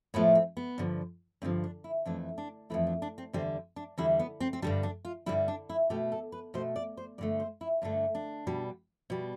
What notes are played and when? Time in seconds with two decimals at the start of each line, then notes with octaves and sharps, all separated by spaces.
0.14 A2 F3 A3 B3
0.35 C4
0.57 B3
0.78 G2 D3 F3
1.42 G2 D3 F3 C4
1.64 D4
1.84 E4
2.06 F2 E3 A3 D4
2.38 D4
2.70 F2 E3 A3 E4
2.87 D4
3.02 D4
3.18 C4
3.33 E2 D3 G3 C4
3.76 D4
3.98 E2 D3 G3 E4
4.19 B3
4.40 C4
4.53 C4
4.62 G2 D3 G3 D4
4.83 D4
5.05 F4
5.26 G2 D3 G3 E4
5.48 D4
5.69 E4
5.90 B2 A3 G4
6.12 A4
6.32 B4
6.54 B2 A3 C5
6.76 D5
6.97 C5
7.18 G2 D3 A3 D5
7.40 C5
7.61 E4
7.82 G2 D3 A3 D4
8.15 D4
8.47 B2 G3
9.10 B2 G3